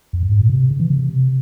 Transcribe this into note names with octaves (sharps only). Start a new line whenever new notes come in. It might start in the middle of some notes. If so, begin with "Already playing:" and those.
F2
G2
G#2
A#2
C3
C#3
E3
C#3
C3
C3